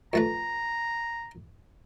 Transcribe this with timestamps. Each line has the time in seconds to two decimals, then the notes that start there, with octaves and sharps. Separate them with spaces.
0.13 F2 A3 B4 A#5